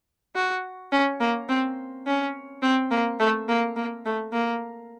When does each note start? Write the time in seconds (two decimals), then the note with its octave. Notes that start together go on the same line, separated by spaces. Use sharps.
0.36 F#4
0.92 C#4
1.20 A#3
1.49 C4
2.07 C#4
2.62 C4
2.91 A#3
3.20 A3
3.49 A#3
3.76 A#3
4.06 A3
4.33 A#3